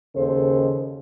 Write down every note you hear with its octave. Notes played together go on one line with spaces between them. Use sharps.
D#2 C#3 A4 C5